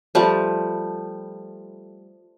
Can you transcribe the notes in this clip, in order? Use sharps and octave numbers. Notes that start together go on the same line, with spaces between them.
F3 G3 A3